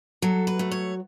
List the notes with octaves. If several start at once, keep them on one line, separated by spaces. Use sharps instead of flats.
F#3 A4
B4
A3
C#5